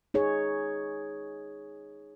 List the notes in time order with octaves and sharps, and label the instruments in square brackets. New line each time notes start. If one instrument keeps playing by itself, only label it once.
[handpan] D#4 G#4 C#5